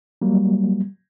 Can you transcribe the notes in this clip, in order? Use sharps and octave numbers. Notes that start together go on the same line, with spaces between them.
F#3 G3 A#3